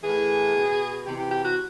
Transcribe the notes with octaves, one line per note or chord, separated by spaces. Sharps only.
A2 E3 G#4
B2
C3 E3 G4
G4
G4
F#4